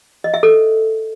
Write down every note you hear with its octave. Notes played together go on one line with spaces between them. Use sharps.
D#5
E5
A4